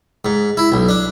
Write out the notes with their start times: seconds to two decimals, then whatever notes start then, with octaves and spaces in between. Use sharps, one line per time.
0.25 G#2
0.57 E4
0.72 B1
0.89 D4